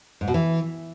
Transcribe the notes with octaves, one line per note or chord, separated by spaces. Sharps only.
G#2
B2
E3